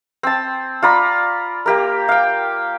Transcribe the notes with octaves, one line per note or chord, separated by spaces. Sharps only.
C4 A5
F4 D5 A#5 B5
A#3 G4 A#4
F5 G5